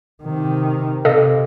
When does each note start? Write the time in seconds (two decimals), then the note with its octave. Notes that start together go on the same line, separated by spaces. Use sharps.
0.23 C3 D#3
1.05 C3 A4 D#5 F5